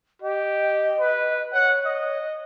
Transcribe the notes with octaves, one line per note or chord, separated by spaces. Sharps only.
G4 D#5
B4
C#5 F#5
D#5